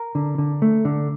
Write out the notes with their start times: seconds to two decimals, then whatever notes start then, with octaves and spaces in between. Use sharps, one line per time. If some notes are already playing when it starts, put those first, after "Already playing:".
Already playing: A#4
0.15 D3
0.38 D3
0.62 A3
0.85 D3